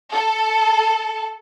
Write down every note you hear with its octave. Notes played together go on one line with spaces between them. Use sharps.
A4